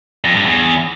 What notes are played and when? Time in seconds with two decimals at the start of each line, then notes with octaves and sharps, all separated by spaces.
0.25 F2
0.35 G2
0.46 E2